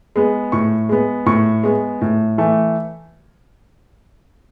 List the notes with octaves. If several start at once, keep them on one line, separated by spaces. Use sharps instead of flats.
G#3 B3
A2 C#6
G#3 B3
A2 C#6
G#3 B3
A2
E3 A3